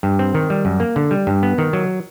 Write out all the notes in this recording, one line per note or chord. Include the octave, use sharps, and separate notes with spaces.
G2
C4
D#3
G3
F#2
A#3
D3
G3
G2
B3
D#3
F#3